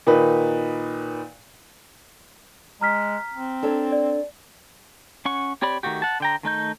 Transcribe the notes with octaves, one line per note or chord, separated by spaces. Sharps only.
A#2 D#3 D#4 B4
G#3 A#5 F6 B6
C4
D4 A4 C#5
D5
C#4 F#5 C#6
C4 G4 C#5 D5 B5
D#3 F3 A3 F#4 G4
F#5 A5
D3 G5 A#5
D#3 A3 D#4 G6